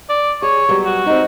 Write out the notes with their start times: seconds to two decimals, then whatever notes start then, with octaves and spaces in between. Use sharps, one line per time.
0.09 D5
0.42 G#4 C#5
0.69 F#3 G3 B3
0.85 F#4
1.06 C4 D#4